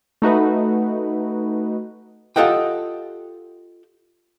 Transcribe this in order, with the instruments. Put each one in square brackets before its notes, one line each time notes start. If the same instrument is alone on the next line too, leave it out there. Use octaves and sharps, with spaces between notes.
[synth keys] A3 D#4 F#4 B4
[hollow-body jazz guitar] F4 G4 A4 D#5 F#5 G5